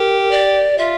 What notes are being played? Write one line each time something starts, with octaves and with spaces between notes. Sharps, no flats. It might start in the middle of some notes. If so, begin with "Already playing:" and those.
Already playing: G4 A#4
D5
F4 E5